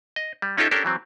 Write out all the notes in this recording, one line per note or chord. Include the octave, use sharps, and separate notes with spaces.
D#5
G3
C#4 D#4 F4 G4 A4 E5
C#4 D4 G4 A4 A#4
E3 F#3 C4